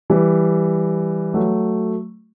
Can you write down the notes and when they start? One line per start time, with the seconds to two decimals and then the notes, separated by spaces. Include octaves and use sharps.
0.10 E3 G3
1.34 F#3 A3